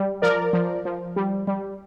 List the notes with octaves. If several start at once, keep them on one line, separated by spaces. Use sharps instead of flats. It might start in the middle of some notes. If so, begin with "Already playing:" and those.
Already playing: G3
F3 A#4 D5
F3
F3
G3
G3